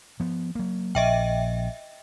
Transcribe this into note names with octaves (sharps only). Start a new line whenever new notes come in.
F3 B3
F#3 A#3
A#1 D#5 E5 G5